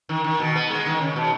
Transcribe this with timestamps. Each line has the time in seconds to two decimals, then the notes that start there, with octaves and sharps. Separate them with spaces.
0.09 D#3
0.24 D#3
0.40 B2
0.55 B3
0.70 G#3
0.86 D#3
1.01 C#3
1.16 B2